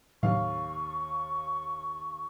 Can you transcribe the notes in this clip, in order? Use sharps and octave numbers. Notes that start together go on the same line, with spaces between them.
D#2 A2 C3 F#3 F5 C#6